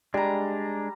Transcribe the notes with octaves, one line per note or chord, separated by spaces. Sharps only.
G3 G#3 D4 A#5